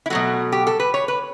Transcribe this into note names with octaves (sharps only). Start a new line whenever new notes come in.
E4
B2 F#3 A3 F#4
G4
A4
B4
C#5
B4